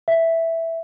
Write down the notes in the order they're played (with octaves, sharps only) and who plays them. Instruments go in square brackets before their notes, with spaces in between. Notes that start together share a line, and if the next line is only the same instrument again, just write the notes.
[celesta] E5